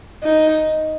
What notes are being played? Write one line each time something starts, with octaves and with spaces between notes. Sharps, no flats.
D#4